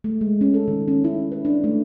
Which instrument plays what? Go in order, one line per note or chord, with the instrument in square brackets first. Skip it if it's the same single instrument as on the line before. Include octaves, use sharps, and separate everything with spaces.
[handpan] A3
G#3
C#4
A4
D#3
C#4
E4
B4
D4
A3